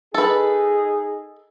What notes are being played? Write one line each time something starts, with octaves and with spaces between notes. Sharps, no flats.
D#4 G#4 A4 B4